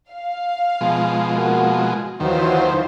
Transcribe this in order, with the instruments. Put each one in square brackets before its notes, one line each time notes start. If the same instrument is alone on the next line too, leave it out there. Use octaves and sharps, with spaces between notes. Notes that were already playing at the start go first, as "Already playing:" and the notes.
[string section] F5
[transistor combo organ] B2 F3 G#3
[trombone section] A#3 F#4
[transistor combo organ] D#2 D#3 [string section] E3 F4 C5 [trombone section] F#3